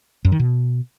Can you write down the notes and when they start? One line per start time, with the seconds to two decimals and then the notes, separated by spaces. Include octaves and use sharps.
0.25 F#2
0.32 D#3
0.39 B2